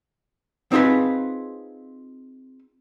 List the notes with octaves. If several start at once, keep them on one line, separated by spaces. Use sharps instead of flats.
C4 D#4 F4 G#4 B4